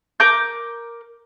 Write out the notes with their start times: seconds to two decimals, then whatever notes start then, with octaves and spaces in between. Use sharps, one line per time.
0.20 A#4 D6 G6